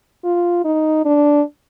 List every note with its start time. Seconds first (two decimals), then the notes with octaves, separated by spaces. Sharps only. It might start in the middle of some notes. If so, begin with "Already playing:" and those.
0.24 F4
0.65 D#4
1.05 D4